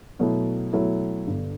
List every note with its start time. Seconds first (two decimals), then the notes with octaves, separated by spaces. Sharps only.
0.19 B2 F#3 A3 E4
0.73 B2 F#3 A3 E4
1.27 G1 G2 D3